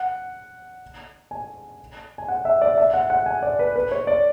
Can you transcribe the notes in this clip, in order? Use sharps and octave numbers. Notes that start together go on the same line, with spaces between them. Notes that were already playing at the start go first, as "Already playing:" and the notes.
Already playing: F#5
G#5
G#5
F#5
E5
D5
D5
E5
F#5
F#5
G#5
D5
B4
B4
C#5
D5